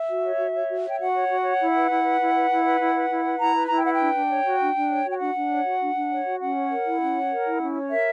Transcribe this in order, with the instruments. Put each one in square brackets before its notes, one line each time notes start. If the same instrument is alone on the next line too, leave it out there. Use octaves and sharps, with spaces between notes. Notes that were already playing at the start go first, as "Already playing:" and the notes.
Already playing: [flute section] E5
F#4
C#5
F#4
C#5
F#4
C#5 G5
F#4 F#5
C#5
F#4
C#5
E4
B4
E4
B4
E4
B4
E4
B4
E4
B4
E4
B4
E4 A#5
B4
E4 A#5
G5
B4 F#5
G5
D4
D4
C#5
F#4
D4
D4
C#5
F#4
G5
D4 F#5
D4
C#5
F#4
D4
D4
C#5
F#4
C#4 F#5
C#5
A#4
E4
C#4
C#5
A#4
E4
C#4
C#5
A#4 E5